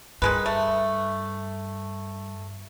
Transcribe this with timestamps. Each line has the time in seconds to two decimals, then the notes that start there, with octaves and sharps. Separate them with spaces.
0.22 G2 D#3 G#3 B4
0.46 A3